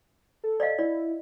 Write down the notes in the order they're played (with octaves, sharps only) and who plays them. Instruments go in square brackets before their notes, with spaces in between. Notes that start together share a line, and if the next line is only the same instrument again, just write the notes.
[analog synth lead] A4
[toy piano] D5 D#5 F5
[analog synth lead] E4 [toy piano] D5